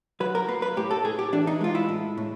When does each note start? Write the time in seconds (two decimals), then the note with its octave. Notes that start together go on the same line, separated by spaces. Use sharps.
0.20 F#3 B4
0.35 A#4
0.48 A#3 B4
0.62 B4
0.77 A2 G4
0.91 A4
1.04 A2 G#4
1.19 G4
1.32 E3 D4
1.47 D#4
1.61 G#3 F4
1.75 E4
1.89 A2
2.18 A2